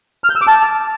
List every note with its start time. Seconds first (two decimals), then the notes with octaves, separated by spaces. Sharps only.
0.24 F6
0.30 G6
0.36 E6
0.42 D6
0.48 A5